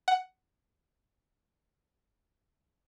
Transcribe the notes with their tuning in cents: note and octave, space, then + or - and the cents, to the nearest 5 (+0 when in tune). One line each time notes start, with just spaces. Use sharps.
F#5 +10